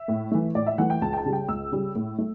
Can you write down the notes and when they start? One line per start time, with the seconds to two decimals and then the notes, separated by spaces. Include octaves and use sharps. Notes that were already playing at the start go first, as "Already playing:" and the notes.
Already playing: E5
0.08 A2
0.32 E3 A3
0.55 A2 D5
0.66 E5
0.78 E3 A3 F#5
0.90 G5
1.02 C#2 A5
1.13 G5
1.17 A5
1.25 C#3 G3
1.33 G5
1.49 C#2 E6
1.72 C#3 G3
1.95 A2
2.18 A3